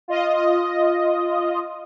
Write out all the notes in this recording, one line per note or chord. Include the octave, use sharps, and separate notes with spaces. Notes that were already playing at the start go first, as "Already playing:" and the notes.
F4 D#5